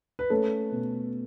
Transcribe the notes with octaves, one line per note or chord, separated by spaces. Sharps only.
B4
A3 C#4 A4
B2